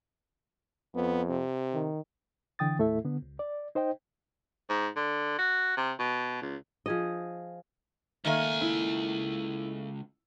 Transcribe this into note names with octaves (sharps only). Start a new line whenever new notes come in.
F2 B3
C3
D#3
D3 E3 G5 D#6 A6
D#2 A2 A3 E4 A4 E5
D3 B3
C#2
D5
D#4 C5 D#5 G5
G#2
D3
F#4
C3
B2
C#2
F3 G#4 D#5
C#2 D#3 A3 A#3 G#5
E4